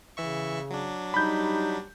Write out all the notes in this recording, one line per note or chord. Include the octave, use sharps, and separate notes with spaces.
C#3 E3 E5 C#6
F#3 D4
G3 D#4 B5 G6